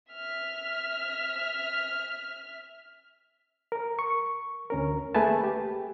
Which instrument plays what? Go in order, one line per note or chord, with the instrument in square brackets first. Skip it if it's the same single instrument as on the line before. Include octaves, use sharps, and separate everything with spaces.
[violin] E5 F6
[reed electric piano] A#4
C#6
D2 C#4 A#4
A3 A#3 G#4 B4 G#5 A5
G4